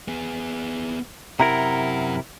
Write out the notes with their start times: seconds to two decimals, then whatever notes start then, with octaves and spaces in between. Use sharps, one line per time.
0.08 B3 G#4
1.40 F#2 C3 E4 A#4 F#5 A#5